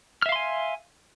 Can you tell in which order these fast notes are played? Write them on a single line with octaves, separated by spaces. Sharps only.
F6 E5 F5 C6 G#5